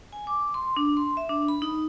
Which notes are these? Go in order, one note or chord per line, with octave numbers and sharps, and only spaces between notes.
G#5
D6
C6
D4
C6
E5
D4
B5
D#4